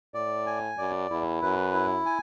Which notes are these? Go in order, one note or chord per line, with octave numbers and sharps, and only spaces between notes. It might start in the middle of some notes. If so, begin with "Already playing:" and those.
A2 D5
G#5
F#2 D5
E2 E4
F#2 B4
E4
G#5